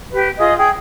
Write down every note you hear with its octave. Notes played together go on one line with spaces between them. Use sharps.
G4 B4
F4 G#4 D#5
G#4 G5